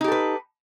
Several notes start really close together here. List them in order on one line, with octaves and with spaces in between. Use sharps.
D#4 G4 A4 B4